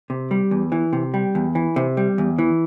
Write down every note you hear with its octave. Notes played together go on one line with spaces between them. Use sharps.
C3
G3
E2
E3
C3
G3
E2
E3
C3
G3
E2
E3